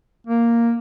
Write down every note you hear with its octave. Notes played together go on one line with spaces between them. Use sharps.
A#3